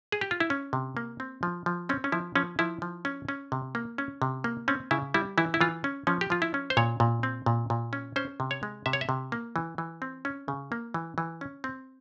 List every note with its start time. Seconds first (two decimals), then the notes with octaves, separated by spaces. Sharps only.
0.12 G#4
0.21 G4
0.31 F4
0.40 E4
0.50 C#4
0.73 C3
0.97 A#3
1.20 C4
1.43 F3
1.66 F3
1.89 C4 C#4
2.04 C#4
2.12 F3 E4
2.36 F3 C#4
2.59 F3 E4
2.82 F3
3.05 C#4
3.29 C#4
3.52 C3
3.75 A#3
3.98 C#4
4.22 C3
4.44 A#3
4.68 C4 C#4
4.91 C#3 E4
5.14 G3 E4
5.38 E3 E4
5.54 E4
5.61 E3 F4
5.84 C#4
6.07 F3 C#4
6.21 G4
6.30 F3 F4
6.42 E4
6.54 C#4
6.70 C5
6.77 A#2 C#5
7.00 A#2
7.23 C4
7.46 A#2
7.70 A#2
7.93 C#4
8.16 C#4 C5
8.40 C3
8.51 C#5
8.63 G#3
8.86 C3 E5
8.93 C#5
9.01 E5
9.09 C3
9.32 A#3
9.56 E3
9.78 E3
10.02 C4
10.25 C#4
10.48 C#3
10.72 A#3
10.94 E3
11.18 E3
11.41 C#4
11.64 C4